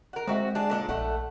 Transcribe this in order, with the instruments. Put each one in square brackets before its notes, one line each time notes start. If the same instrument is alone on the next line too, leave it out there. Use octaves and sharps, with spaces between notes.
[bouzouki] A#4 F#5
[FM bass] G#3 [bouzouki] C4 F#4 E5
[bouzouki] D4 G#4
A#2 D4 F#5
[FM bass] A#1 [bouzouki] A3 F#5